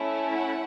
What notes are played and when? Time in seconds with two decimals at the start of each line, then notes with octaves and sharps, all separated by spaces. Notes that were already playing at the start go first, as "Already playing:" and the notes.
Already playing: A3 C#4 E4
0.33 F#5